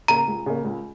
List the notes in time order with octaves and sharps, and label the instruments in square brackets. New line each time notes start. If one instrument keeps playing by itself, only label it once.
[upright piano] C#3 A#3 [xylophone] A#5
[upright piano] C#2
C#3 A#3
C#2